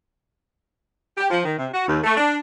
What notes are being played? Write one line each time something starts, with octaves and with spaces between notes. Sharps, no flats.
G4
F3
D#3
C3
F#4
D#2
A3
D4